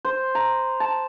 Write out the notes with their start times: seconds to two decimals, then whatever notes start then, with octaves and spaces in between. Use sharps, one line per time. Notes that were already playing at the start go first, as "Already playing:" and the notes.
0.05 C5
0.35 A#5
0.80 A5